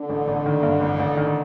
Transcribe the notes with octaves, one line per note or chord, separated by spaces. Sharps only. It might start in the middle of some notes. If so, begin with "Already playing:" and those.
Already playing: D3
A1
A1
D#3
G2
A1
A1
D#3